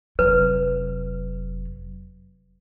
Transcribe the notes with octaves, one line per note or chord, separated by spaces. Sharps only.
F1 F#3 B4